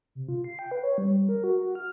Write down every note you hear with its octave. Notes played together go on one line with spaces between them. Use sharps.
C3
F4
C7
G5
B4
C#5
G3
G3
A#4
F#4
F#4
F6